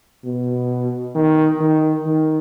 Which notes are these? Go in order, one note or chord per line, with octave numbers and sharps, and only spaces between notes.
B2
D#3
D#3
D#3